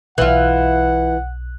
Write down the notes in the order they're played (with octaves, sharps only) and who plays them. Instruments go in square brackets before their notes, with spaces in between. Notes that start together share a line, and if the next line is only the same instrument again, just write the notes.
[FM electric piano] B1 F#6 [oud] E3 F4 [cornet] F#5